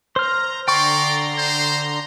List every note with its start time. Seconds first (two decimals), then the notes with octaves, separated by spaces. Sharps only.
0.16 C5 A#5 F6
0.68 D3 D5 G5 A#5 C6 C#6
1.38 C5